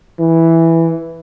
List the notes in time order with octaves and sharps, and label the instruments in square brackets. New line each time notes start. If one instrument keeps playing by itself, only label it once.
[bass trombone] E3